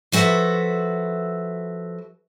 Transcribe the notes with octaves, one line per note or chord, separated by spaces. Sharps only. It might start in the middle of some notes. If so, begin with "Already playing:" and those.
F3 F#4 A4 B4 E5